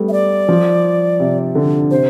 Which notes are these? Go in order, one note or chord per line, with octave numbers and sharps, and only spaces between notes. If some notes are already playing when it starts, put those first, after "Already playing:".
Already playing: G3 A3 B3
E5
D5
F3
C3
D3
C3 C5